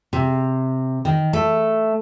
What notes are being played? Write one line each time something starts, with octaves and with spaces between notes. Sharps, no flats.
C3
D#3
A3